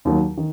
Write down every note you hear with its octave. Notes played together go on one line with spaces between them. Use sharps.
D#2 D#3 F#3
D#3